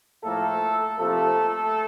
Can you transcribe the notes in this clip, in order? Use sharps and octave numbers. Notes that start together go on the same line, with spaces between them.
A2 F3 A3 A#3 A4
C3 F3 A3 A#3 A4